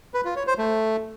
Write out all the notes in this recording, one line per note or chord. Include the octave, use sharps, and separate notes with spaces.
B4
F4
C#5
C5
A3